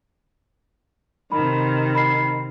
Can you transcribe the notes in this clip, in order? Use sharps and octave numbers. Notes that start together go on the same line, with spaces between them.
C3 D#3 B5
B5 C7